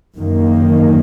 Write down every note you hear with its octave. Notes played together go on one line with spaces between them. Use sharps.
F#2 D#3 A#3